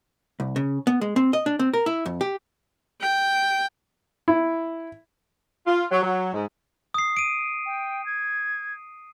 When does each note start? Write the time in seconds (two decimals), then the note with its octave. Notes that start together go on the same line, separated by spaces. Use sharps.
0.40 C2
0.56 C#3
0.87 B3
1.01 G#3
1.16 C4
1.33 D#5
1.46 D4
1.59 C4
1.74 A#4
1.86 E4
2.06 F2
2.21 G4
3.01 G5
4.28 E4
5.67 F4
5.91 F#3
6.03 F#3
6.33 G#2
6.94 D#6 C7
7.17 D7 D#7
7.66 G5
8.06 G#6